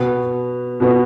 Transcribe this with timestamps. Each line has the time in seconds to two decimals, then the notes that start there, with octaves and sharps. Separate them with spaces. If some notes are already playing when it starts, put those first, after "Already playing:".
Already playing: B2 B3 F#4
0.80 B2 B3 F#4